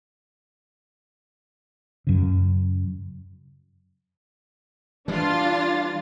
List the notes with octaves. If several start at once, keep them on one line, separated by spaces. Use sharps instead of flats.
F#2 C#3
E3 G3 D4 F4 A6